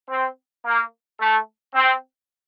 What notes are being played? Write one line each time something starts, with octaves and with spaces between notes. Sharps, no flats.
C4
A#3
A3
C4